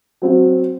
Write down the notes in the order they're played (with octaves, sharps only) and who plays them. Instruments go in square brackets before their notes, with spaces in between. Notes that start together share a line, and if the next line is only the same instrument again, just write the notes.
[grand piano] F#3 C4 F#4